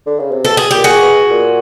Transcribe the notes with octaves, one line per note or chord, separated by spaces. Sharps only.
D3
C#3
C3
B2 A4
G#4
A#2 G4
F#4 G#4
B2
A#2